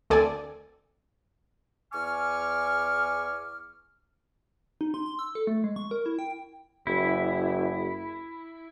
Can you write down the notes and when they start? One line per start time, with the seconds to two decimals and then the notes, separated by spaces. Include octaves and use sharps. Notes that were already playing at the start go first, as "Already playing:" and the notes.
0.10 D2 C4 A4 D5 G#5
1.93 E2 G#5 C#6 D6 F6
4.81 D#4
4.94 C6
5.06 C6
5.19 E6
5.35 A4
5.47 A3
5.64 G#3
5.76 C#6
5.91 A#4
6.06 E4
6.19 G5
6.87 F#1 E4